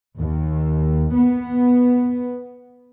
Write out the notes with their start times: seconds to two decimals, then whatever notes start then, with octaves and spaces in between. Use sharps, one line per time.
0.18 D#2
1.14 B3